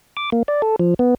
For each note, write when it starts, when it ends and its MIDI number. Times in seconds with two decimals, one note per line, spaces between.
0.17 0.30 86
0.32 0.43 58
0.48 0.62 74
0.62 0.76 69
0.79 0.94 53
0.99 1.15 59